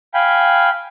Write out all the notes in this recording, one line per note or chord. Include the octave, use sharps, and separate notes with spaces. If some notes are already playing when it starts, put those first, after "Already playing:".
F5 G5 G#5 B5